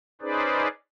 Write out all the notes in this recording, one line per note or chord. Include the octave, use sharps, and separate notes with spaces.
C#4 D#4 G#4 B4 C5 D5